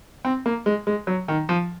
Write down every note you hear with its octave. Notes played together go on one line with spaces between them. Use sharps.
C4
A#3
G#3
G#3
F#3
D#3
F3